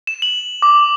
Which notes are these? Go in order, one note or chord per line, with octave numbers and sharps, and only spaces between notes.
E7
F#7
D6